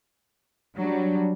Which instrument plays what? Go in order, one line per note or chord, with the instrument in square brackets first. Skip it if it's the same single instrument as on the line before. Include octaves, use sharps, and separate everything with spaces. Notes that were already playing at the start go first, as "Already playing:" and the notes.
[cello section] F#3 G3 [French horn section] D4